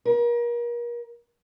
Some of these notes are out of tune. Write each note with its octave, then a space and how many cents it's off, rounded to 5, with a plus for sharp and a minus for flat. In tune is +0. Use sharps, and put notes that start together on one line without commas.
A#4 +35